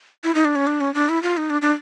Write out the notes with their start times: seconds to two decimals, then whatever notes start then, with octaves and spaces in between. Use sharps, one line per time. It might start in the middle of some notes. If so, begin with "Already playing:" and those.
0.24 E4
0.35 D#4
0.45 D4
0.56 C#4
0.67 D4
0.81 C#4
0.94 D4
1.09 E4
1.23 F4
1.37 D#4
1.50 D4
1.62 D4